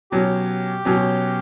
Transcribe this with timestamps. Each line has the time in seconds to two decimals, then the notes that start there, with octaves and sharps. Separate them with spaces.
0.11 B2 F#3 C#4 G4
0.85 B2 F#3 C#4